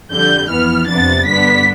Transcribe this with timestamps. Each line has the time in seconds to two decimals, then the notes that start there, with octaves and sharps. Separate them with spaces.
0.11 F2 D3 G3 G6
0.50 F2 E3 B3 F6
0.88 F2 C3 F3 B3 D4 A6
1.27 G2 D3 G3 B3 D4 B6